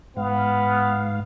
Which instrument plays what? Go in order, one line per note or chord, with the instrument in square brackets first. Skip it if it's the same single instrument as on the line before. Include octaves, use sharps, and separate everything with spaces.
[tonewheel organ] G#2 F5 [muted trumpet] B3